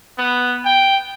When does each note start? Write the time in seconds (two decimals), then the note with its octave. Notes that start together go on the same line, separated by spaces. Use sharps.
0.18 B3
0.65 G5